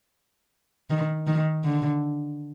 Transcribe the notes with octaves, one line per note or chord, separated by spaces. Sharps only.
D#3
D#3
D3